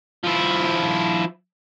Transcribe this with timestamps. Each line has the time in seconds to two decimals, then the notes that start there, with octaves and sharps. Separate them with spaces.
0.24 F3 E4